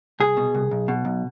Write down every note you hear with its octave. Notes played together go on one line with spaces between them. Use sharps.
C2 G#4
B2
C2
B1
B2
B1